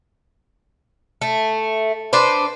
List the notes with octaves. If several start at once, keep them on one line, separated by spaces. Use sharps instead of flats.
A3
D4 B4 C5